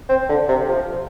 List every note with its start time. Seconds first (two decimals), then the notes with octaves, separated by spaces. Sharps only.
0.09 C4
0.29 D3
0.48 C3
0.68 F3